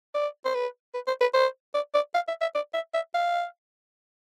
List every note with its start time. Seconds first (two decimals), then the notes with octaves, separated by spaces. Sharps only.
0.15 D5
0.45 C5
0.54 B4
0.94 B4
1.07 C5
1.21 B4
1.34 C5
1.74 D5
1.94 D5
2.15 F5
2.28 E5
2.41 E5
2.55 D5
2.74 E5
2.94 E5
3.15 F5